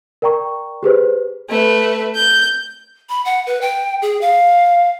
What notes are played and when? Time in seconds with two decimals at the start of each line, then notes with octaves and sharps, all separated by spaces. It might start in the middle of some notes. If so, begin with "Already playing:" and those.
0.22 A#4 D5 G5 A#5 C#6
0.83 G4 G#4 B4 C5
1.49 A3 B4
2.15 G6
3.09 B5
3.25 F#5
3.47 B4
3.61 G5
4.02 G#4
4.21 F5